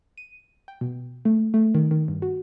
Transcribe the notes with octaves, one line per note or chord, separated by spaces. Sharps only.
D#7
G5
B2
A3
A3
D#3
D#3
G2
F#4